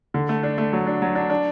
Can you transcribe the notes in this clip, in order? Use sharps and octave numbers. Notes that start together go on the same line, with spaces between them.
D3
A3
D4
A3
F#3
D4
F#3
D4
D4